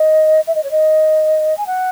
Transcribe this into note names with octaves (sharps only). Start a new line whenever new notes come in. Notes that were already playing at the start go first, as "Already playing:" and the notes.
Already playing: D#5
E5
D#5
C#5
D#5
G#5
F#5